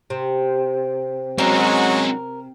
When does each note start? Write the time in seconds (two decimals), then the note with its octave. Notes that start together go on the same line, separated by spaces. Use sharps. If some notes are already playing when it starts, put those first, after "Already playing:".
0.10 C3
1.38 F#3 G#3 C4 C#4 F#4 A#4